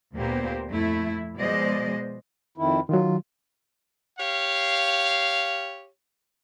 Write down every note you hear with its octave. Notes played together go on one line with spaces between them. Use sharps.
D2 A#2 A#3 B3 G4 C5
F2 A3 E4
B2 F3 G#3 C5 D5 D#5
F2 D#3 E4
D#3 F#3 F4
G4 C#5 F5